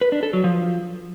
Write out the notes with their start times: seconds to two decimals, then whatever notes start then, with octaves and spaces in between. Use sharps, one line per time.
0.01 B4
0.12 D4
0.23 A4
0.33 F#3
0.44 F3